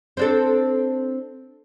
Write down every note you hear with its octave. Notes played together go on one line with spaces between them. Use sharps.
C4 D4 A4